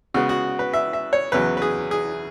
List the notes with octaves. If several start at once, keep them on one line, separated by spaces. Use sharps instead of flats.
C#3 G#3 B3 F#4
F#4
B4
E5
E5
C#5
E2 C#3 F#3 B4
B4
G#4
G#4